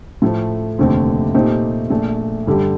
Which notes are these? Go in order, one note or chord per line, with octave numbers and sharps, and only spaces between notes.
A2 F3 A3
F1 D#2 D3 A3 C4
A#2 A3 C4 D#4 G4
A#1 A#2 A3
G2 D3 G3 D4 G4